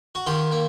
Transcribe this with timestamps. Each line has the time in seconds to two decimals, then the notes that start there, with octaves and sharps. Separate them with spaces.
0.15 F#4
0.26 D#3 F4 G4
0.52 A#3